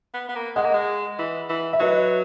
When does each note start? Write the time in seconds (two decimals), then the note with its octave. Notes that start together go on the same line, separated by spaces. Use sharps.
0.14 B3
0.29 B3
0.35 A#3
0.56 G#3 D#5 F#5
0.65 A#3
0.74 G#3
1.19 E3
1.50 E3
1.73 E5
1.80 F#3 B4 D#5